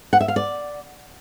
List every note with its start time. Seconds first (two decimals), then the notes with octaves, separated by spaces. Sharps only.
0.13 F#5
0.21 E5
0.28 F5
0.36 D5